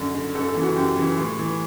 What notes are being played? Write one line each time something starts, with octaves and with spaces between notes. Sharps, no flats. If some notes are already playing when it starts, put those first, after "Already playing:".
Already playing: F#2 D3
D3
F#2 A4
A4
C#3 E3
F#4
F#2 G4
C#3 E3
A2
E3